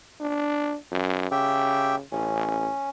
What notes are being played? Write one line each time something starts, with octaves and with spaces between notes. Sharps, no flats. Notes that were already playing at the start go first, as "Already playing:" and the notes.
D4
F#2
C#3 G4 E5 G5
A1 C#4